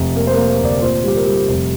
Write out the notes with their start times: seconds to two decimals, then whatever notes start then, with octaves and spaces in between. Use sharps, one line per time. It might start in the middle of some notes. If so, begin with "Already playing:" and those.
Already playing: F1
0.16 A#3 A#4
0.27 C5
0.33 A#4
0.37 A#3
0.48 A#4
0.60 D2 D5
0.82 A#2 C5
1.03 G3 G4
1.16 A#4
1.26 G3
1.48 F1